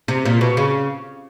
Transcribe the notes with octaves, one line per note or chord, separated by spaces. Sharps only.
C3
A#2
B2
C#3